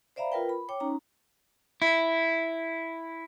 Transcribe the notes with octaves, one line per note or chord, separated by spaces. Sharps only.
C5 D5 E5 F5 A#5 B5
F4 A#4 B4 G5
B5
C#5 G5 D6
C#4 D#4 A#5
E4